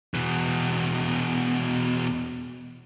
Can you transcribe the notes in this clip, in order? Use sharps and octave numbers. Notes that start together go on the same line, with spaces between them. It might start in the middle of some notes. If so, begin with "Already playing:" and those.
E2 B2